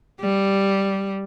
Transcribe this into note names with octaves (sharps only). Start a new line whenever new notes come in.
G3